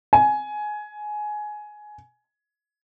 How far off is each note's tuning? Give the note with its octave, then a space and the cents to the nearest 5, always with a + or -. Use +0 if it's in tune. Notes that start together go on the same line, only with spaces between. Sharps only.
G#5 +15